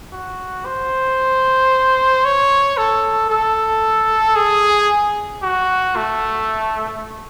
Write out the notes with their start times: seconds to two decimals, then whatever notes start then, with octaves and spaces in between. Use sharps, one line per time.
0.12 F#4
0.66 C5
2.25 C#5
2.77 A4
3.30 A4
4.36 G#4
5.42 F#4
5.96 A3